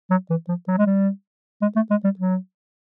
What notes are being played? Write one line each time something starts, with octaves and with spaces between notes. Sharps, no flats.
F#3
E3
F3
F#3
G#3
G3
G#3
A3
G#3
G3
F#3